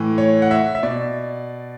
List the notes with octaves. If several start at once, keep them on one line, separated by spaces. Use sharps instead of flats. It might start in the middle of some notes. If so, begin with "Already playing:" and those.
Already playing: A2 E3
C#5
F#5
E5
E5
B2 D5